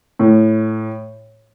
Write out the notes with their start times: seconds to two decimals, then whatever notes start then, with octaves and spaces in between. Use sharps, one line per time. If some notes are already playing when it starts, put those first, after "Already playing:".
0.19 A2